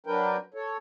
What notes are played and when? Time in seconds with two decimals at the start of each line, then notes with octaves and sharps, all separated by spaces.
0.06 F#3 D4 A#4 B4 G5
0.54 A4 C#5